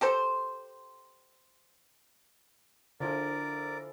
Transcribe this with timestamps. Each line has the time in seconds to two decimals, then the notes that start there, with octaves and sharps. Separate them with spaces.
0.01 G4 A4 C5
3.00 D3 F3 E4 A#4 D5 G#5